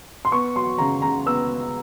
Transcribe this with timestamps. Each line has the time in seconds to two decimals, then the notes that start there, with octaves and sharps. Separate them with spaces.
0.25 C6
0.31 B3 C#6
0.56 F#3 C6
0.78 C#3 A#5
1.02 C#3 A#5
1.26 B3 E6